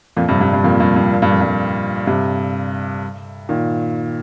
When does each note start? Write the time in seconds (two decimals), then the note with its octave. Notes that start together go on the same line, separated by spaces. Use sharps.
0.17 F2 A#2
0.28 G2 C3
0.41 G2
0.53 G2
0.64 F2 A#2
0.80 G2
0.96 G2
1.12 A#2
1.22 G2
1.32 F2
1.41 G2
2.07 G2 C3
3.49 A#2 D#3